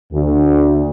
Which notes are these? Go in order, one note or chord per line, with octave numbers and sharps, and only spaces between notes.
D2